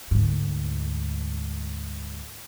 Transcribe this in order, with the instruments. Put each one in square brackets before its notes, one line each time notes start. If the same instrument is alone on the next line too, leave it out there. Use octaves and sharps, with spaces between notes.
[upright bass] D2 G#2